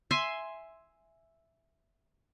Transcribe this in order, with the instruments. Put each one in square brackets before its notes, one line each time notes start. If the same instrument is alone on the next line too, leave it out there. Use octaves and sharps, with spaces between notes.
[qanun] E5 G#5 C6